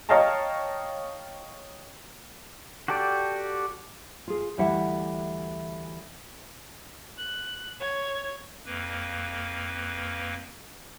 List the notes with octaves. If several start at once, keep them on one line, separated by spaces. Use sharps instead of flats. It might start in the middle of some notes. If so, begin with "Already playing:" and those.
C#5 D#5 F5 G5 A5 A#5
F#4 G4 A4 D5 G5
F4 G#4
D2 E3 G3 E4 F#5
F#6
C#5 G#6
F2 A#3 B4